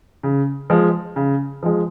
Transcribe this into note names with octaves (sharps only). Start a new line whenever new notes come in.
C#3
F3 G#3
C#3
F3 G#3